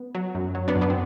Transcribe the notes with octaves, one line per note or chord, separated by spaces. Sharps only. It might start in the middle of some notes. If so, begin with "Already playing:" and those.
Already playing: B3
F#3
F#2
F#3
B3 D4
F#2
B3 D4
C4